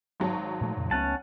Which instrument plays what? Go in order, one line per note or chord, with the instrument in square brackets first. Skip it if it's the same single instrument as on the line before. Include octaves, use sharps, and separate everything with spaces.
[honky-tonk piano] G#1 F#3 A5
[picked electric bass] A#2 F3 A3
F2 A#2 C#3
[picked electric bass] C#2 A3 B3 [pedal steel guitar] C#4 F#5 A5